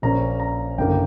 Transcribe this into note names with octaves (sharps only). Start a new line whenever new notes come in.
A#1 A#2 A#3 C#4 A#5
A#5
F#1 F#2 D3 A#3 G5